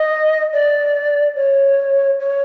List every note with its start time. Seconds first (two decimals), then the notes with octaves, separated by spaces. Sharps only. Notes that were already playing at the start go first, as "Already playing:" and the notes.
Already playing: D#5
0.53 D5
1.36 C#5
2.20 C#5